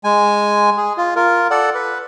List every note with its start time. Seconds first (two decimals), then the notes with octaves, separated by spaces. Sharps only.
0.04 G#3 G#5
0.77 G#4
0.98 F4
1.16 F4 A#4
1.51 A4 D5 F#5
1.75 B4